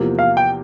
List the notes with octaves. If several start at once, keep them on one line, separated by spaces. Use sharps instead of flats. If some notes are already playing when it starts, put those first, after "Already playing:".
Already playing: E2 C3 F3 A#3
F5
G5